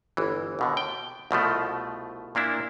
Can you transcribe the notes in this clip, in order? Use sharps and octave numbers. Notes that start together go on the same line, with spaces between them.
G1 E3
D#2 B2 D3
G5
C2 B2 F3 A3
A#2 A#3 D4 E4